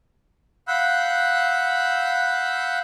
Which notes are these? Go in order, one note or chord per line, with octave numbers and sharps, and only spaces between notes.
F5 F#5 B5 E6 F#6 G6